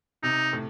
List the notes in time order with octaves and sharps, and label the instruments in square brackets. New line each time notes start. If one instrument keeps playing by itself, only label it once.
[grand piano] C3 [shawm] D#4
[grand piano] A2